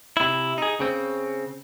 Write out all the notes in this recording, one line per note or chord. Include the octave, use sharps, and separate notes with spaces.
C3 E4
D#4 G#4
C#3 C4